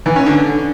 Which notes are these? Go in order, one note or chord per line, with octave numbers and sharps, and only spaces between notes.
E3
C#4
D3